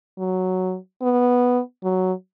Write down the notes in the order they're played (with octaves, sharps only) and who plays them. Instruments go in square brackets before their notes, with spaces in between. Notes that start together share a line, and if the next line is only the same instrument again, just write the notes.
[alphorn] F#3
B3
F#3